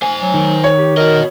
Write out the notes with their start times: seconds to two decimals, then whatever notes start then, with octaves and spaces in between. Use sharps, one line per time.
0.02 C5 G#5
0.21 F#3
0.34 D#3
0.64 C#5
0.78 G4
0.97 F#4 A#4 D#5